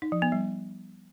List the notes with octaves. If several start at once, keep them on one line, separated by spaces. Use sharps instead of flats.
D#4
F3
B3
G3